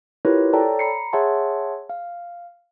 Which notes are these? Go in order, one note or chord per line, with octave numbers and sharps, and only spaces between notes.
E4 F4 G4 A#4 B4 C#5
A4 C#5 D5 G5 A5 A#5
A#5 B5 C7 C#7
G#4 C#5 E5 F#5 A5 C6
F5